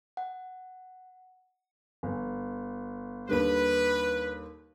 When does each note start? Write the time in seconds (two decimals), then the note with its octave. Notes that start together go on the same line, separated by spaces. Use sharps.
0.17 F#5
2.03 G1
3.29 D#2 D3 G3 B4